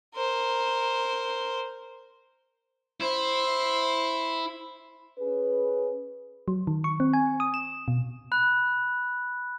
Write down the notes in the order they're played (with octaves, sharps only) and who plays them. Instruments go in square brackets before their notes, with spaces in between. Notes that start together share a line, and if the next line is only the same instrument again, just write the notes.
[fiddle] A#4 C5
[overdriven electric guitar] E4 [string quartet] C5 C6
[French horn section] C#4 G#4 B4
[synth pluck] F#3
D#3
C#6
C4
G#5
D#6
E7
B2
[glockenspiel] B5 F#6